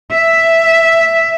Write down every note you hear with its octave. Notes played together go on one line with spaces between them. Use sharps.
E5